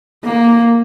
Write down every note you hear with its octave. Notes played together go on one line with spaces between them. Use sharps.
A#3